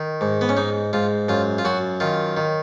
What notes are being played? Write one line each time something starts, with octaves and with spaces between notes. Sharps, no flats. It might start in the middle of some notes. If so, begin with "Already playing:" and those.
Already playing: D#3
G#2
B3
C#4
G#2 D#4
G#2 F4
F#2 F4
F4
F#2 F#4
D#3 F4
D#3